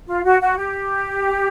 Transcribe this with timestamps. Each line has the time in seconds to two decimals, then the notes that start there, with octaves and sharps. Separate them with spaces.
0.07 F4
0.24 F#4
0.41 F#4
0.57 G4